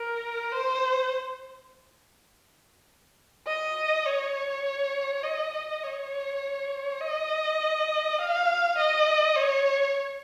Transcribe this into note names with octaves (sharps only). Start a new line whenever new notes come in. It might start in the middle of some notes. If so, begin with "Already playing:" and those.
Already playing: A#4
C5
D#5
C#5
D#5
D#5
C#5
D#5
F5
D#5
C#5